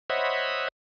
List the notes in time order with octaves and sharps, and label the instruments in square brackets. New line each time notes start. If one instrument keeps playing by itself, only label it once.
[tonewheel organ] C5 C#5 D#5 E5 F#5 B5